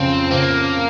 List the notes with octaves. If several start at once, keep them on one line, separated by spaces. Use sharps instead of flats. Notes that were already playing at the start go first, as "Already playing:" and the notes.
Already playing: F2 C#3 C4
C#3 A#3